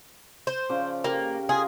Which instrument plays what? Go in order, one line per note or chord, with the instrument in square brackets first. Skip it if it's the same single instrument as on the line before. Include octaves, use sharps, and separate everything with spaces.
[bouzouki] C5
[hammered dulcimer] C#3 F3 D5
[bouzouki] A#3 [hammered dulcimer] G4 A#4
[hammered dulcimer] F4 D#5 [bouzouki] G#4